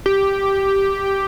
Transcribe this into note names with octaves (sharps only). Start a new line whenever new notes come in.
G4